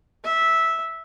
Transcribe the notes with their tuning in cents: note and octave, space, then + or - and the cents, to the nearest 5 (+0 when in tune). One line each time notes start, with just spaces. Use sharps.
E5 -10